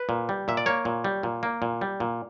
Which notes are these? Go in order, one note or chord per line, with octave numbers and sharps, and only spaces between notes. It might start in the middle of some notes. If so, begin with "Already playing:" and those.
Already playing: B4
A#2
G3
A#2 E5
D5
A#3 C#5
A#2
G3
A#2
A#3
A#2
G3
A#2